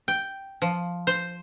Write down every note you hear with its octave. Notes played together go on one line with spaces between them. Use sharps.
G5
F3
C5